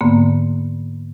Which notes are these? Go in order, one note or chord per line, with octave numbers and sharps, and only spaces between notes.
G#2 D3 A#3 B3